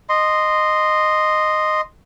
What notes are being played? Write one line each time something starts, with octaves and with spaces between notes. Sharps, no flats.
D#5 C6